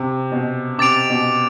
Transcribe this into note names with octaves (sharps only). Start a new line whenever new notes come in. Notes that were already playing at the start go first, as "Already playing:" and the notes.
Already playing: C3
B2
C3 D6 A6 D7 F7
B2